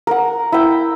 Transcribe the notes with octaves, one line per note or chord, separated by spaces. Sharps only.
A#4 F#5
E4 G5